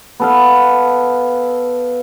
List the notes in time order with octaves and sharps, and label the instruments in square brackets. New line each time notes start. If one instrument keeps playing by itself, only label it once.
[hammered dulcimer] B3 A4 F5